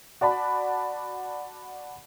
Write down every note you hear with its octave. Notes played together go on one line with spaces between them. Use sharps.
F#4 D5 A5 B5